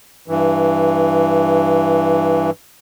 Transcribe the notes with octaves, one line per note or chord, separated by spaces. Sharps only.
G2 E3